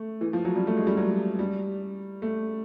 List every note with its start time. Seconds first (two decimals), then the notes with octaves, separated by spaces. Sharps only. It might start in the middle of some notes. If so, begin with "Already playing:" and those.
Already playing: A3
0.21 E3
0.33 F3
0.45 F#3
0.56 G3
0.67 A3
0.77 G#3
0.87 G3
0.97 F#3
1.39 G3
2.22 A3